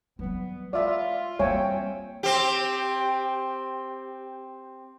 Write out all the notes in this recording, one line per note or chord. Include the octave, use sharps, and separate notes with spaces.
F#3 G3 B3
G#3 F4 D5 E5
G3 A#3 C4 C#5 E5 G5 G#5
C4 G4